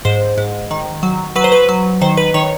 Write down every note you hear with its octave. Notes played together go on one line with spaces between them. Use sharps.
G#2 C5
G#2
D#3
F#3
F#3 B4
C5
B4
F#3
D#3 C5
B4
D#3 C#5